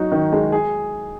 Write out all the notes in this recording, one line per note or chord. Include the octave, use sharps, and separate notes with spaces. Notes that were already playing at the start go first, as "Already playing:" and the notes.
Already playing: F#3 D#4 F#4
D#3
G#3
G#4